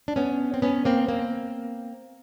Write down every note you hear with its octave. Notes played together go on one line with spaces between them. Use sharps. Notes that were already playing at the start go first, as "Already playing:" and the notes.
D4
B3 C#4
C4
B3 C#4
A#3 C4
A#3 C4